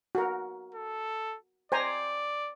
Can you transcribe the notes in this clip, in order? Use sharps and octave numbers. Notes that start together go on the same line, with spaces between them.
F#4 A#4
A4
C5 D5 G#5 A#5